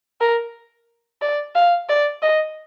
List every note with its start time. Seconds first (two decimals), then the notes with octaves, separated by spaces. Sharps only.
0.21 A#4
1.22 D5
1.55 F5
1.89 D5
2.22 D#5